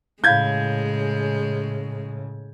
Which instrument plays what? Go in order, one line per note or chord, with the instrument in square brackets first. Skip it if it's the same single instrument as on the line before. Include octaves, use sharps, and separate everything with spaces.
[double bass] A2 C#3 [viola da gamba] G#3 [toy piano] E4 F5 B5 [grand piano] G6 G#6